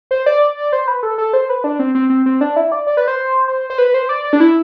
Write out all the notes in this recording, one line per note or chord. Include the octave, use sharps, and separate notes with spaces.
C5
D5
C5
B4
A4
A4
C5
B4
D4
C4
C4
C4
C4
D4
E4
D5
D5
B4
C5
C5
C5
B4
C5
D5
D5
D4
E4